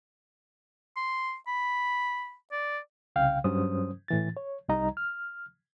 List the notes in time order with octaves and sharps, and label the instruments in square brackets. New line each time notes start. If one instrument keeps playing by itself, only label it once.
[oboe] C6
B5
D5
[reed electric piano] C2 C#3 F5 G5
G2 F#3 C#4 C5 D#6
A2 E3 A6
C#5
C2 G3 D#4 D#5 A#5
F6